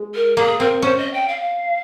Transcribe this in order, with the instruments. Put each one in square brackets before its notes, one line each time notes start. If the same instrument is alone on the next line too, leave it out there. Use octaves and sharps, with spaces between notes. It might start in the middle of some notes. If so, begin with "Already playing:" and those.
Already playing: [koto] G#3
[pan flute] A#4
[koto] A#3 [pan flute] G#4
[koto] C4 [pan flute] A#4
[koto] C#4 [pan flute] C5
[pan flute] D#5
G5
F5